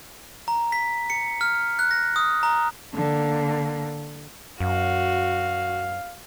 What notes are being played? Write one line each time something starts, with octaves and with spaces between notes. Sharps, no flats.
A#5
B6
C#7
F6
F#6
A#6
D#6
A#5
D3 A#3
F#2 F#4 F5